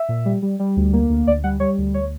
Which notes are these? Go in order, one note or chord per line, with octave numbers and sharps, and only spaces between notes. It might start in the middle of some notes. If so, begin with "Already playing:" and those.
Already playing: E5
A#2
G3
G3
G3
D2
A#3
D2
D2 D5
G3 F#5
G3 C#5
D2
C#5